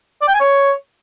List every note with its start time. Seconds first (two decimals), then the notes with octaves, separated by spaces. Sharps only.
0.22 D5
0.28 G5
0.34 G#5
0.40 C#5